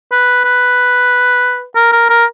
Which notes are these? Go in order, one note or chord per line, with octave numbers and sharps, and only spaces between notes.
B4
B4
A#4
A#4
A#4